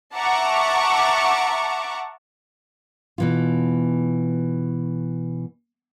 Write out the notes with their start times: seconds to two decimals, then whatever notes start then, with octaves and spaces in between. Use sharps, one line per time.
0.15 E5 F#5 A5 A#5 C#6 D6
3.18 B2 E3 F4